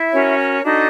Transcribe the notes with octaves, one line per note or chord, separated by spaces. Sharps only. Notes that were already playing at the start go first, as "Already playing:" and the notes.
Already playing: E4 E5
C#4 F#4 A#4 C#5
D4 D#4 F#4 A4 D#5